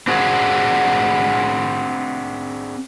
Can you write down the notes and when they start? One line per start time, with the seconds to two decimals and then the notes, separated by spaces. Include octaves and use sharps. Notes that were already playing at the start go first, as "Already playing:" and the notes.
0.08 C4 D4 F#4 G#4